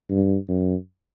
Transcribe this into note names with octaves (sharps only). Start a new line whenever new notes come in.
G2
F#2